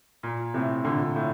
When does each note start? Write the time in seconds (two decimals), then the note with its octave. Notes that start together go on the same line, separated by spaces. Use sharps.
0.23 A#2
0.54 A2 C3
0.85 A#2 D3
1.16 A2